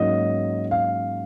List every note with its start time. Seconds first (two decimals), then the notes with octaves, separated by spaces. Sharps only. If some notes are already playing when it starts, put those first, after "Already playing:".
Already playing: G#2 F#3 A#3 C#4 D#5
0.71 F5